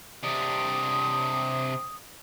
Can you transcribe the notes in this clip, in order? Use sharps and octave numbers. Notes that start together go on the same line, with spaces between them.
C3 D4 D#6